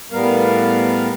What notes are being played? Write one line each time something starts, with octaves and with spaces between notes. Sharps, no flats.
A2 G3 B3 A#4 F5